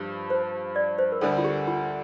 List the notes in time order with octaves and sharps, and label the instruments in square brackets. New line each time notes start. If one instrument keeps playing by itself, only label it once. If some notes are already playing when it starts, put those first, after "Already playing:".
Already playing: [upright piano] G2 F3 [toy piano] G4
[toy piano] C5
D5
C5
A#4
[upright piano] D2 D3 G3 [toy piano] A4
[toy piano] F4
G4
F4